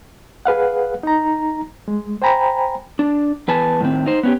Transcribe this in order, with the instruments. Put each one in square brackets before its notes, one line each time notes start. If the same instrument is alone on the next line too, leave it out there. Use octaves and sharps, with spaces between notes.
[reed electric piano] G#4 B4 F5 F#5
D#4 A#5
G#3
C5 G5 G#5 A#5 B5
[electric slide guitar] D4
E2 B4 G#5 A5
A2 D#3 C4
D#4 C5
B3 C#4 G4